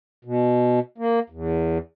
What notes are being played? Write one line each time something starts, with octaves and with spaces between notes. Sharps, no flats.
B2
A#3
E2